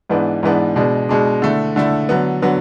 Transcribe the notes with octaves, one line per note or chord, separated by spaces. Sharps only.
G#2 E3 B3 D4
G#2 E3 B3 D4
B2 G#3 D4
B2 G#3 D4
D3 A3 E4
D3 A3 E4
D3 F#3 B3
D3 F#3 B3